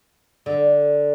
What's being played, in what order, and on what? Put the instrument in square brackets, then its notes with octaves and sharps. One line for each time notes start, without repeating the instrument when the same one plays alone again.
[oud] D3